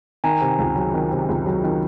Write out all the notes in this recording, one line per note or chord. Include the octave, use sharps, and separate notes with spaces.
D#3 G#5 A#5
C3
C#2
F#3
D#3
C3
C#2
F#3
D#3